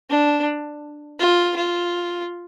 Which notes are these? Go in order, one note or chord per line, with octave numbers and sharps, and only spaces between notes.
D4
F4
F4